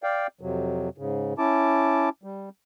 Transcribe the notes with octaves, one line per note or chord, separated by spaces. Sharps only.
D5 F5 G5
F2 C3 F#3
G#2 C#3
C#4 E4 A5 D6
G3